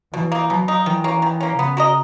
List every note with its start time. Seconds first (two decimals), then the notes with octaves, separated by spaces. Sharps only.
0.13 B2 E3
0.32 A#3 D#4
0.50 B2 F#3
0.68 A#3 D#4
0.86 D#3 E3
1.04 A#3 C#4
1.22 D#3
1.40 A#3 C#4
1.59 C#3 B3
1.77 F#4 A#4 D#5